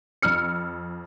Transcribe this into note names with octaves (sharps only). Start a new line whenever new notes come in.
F2 E6 F6 C#7